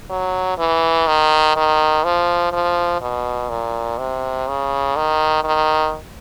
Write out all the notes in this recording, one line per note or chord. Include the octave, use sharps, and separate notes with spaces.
F#3
E3
D#3
D#3
F3
F3
B2
A#2
C3
C#3
D#3
D#3